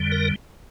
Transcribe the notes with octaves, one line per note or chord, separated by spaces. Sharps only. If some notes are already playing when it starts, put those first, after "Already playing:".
Already playing: F2 D3 G3
A#4